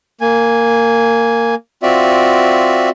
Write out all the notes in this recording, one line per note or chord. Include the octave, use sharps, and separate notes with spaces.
A#3 G#5
C4 F4 F#4 D5 E5